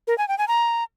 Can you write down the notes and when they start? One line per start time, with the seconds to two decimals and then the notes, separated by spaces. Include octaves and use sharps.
0.07 A#4
0.18 G#5
0.28 G5
0.38 G#5
0.48 A#5